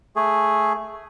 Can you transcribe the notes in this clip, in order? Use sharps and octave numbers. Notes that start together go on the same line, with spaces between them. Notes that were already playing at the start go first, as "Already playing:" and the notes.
A3 G#4